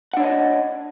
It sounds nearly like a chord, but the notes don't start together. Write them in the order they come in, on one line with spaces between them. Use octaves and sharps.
F#5 D4 C#5 D#5